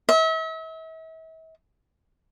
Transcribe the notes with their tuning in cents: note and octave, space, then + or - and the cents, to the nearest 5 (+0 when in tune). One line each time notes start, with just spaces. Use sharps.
E5 -40